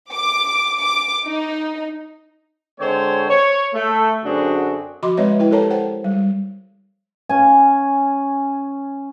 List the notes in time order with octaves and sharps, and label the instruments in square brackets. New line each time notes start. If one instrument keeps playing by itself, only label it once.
[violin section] D6
D6
D#4
[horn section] D3 G#3 C4 C5 C#5
C#5
A3
F#2 D3 C4 D4 F#4 G#4
[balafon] F3 F#4 D#5 B5 C6 D6
G#3 C4 B4 C#5 D#5 E5
E4 B4 G5
G4 A4 A#4 C#5 A5 A#5
C5 F#5 G5
G3
[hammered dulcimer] C#4 G#5